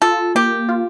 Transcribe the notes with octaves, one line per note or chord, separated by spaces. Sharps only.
F4 A4
A#3 G4
F4